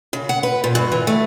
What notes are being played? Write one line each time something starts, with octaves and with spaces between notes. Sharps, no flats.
C#3
F#5
B4
A#2
G2
E3
A3